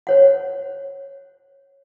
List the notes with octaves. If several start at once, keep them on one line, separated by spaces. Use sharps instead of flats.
C5 C#5 F#5